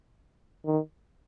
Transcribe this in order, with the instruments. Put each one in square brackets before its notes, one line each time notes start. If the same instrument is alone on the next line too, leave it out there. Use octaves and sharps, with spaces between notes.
[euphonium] D#3